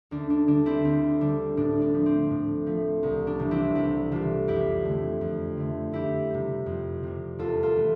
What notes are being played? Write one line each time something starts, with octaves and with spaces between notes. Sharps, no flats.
D2 D4
D4
D3 G3 D4
C4 E4
D2 C4
D3 G3 D4
A2 D4
D4
F3 A3
C4
A2
F3 A3
C2
D4
C3 E3 G3
C4 E4
C2 E4 G4
C3 E3 G3 F4 A4
F2 E4 G4
D3 A3
F2
D3 A3
F2 E4 G4
C3 G3
F2
C3 G3
E2 F4 A4
F4 A4
E3 A3